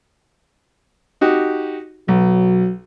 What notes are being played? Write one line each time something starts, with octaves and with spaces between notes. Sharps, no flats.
D#4 F#4 G4
B1 F#3